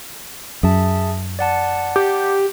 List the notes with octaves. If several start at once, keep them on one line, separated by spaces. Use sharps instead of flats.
F#2 G#4 E5 A5
D5 F#5 A5
G4